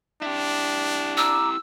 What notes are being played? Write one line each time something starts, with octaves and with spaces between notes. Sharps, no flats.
D4 E4 G4
A#5 D6 E6